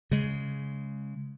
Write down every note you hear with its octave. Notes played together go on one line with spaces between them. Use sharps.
C#3 G#3